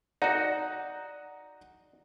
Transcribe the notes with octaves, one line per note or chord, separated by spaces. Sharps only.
D#4 F#4 D5 F#5 A#5